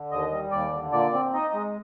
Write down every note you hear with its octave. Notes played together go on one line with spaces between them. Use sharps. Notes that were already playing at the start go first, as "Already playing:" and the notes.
Already playing: D3
D#2 D#5
G3
D#2 D5
D3
A#2 D5
C4
D#4 D#5
G#3